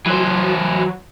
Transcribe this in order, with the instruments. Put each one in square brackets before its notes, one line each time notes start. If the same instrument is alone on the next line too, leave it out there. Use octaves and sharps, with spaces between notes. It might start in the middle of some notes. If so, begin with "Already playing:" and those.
[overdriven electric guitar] E3 C5 [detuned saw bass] F#3